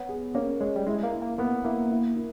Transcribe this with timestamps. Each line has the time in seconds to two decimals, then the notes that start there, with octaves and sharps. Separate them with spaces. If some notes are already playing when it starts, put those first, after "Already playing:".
Already playing: B3 C#5
0.09 G#4
0.35 A#3 C#4
0.60 G#3 C#5
0.76 G3
0.87 G#3 E4
1.03 A#3
1.12 E4
1.22 A#3
1.38 A#3 B3
1.64 A#3 E4
1.91 E4
2.16 E4